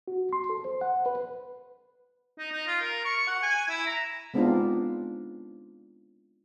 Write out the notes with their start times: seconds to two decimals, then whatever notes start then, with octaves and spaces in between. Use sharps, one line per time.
0.08 F#4
0.33 C6
0.50 A4
0.65 C5
0.81 F#5
1.06 B4
2.39 D#4
2.52 D#4
2.67 F4
2.82 A#4
3.05 C#6
3.28 F#5
3.43 G#5
3.69 E4
3.87 A#5
4.34 G#3 B3 C4 D4 D#4 F4